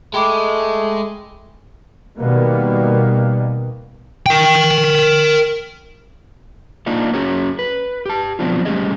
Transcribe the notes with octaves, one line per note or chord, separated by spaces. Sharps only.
G#3 A3 G5 B5 D6
B2 D#3 G3 A#3 B3
A#4 G5
A#3 D4 D#4 F4 F5
C#4 F#4 G#4 C#5 A#5
B4
G4 A5
F3 F#3 B3 C4 D4 F4
G3 A3 C#4 G4 G#4 D#5